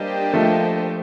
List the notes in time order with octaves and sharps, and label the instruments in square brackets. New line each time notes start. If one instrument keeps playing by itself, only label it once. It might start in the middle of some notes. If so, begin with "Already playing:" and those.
Already playing: [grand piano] G3 [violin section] A#3 D4 G4 C5 D#5
[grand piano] F3 A3